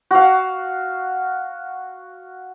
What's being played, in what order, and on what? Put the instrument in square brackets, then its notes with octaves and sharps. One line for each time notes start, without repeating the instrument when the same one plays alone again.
[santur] F#4 F5